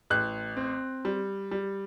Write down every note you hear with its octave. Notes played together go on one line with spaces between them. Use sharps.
A1 F#6
C4
G3
G3